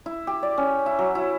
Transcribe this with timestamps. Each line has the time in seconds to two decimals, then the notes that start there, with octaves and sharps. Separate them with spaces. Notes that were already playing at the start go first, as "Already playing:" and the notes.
0.06 E4
0.27 G4
0.43 D5
0.58 C#4
0.86 E4
0.99 F#3
1.15 E4